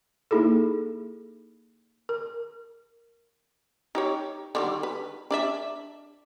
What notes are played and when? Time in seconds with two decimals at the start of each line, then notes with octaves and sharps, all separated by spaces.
0.31 A#3 D#4 E4 G#4 A4
2.09 A#4
3.95 D#4 G4 C#5
4.55 D3 D#3 G3
4.83 B4
5.31 D4 D5 E5